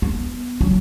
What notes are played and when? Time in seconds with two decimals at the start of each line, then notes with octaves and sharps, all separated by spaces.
0.02 B3
0.61 F#3